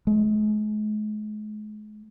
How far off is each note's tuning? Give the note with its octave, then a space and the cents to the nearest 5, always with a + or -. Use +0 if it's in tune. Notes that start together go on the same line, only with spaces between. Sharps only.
G#3 +40